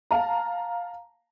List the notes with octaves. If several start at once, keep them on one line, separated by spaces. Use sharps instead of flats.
F5 A5 A#5